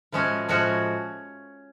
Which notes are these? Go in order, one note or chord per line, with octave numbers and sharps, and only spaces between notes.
A2 F3 G#3 C#4 F#4
A2 F3 G#3 C#4 F#4